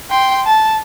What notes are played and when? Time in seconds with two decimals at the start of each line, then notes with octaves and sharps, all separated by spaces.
0.10 G5 C6
0.47 A5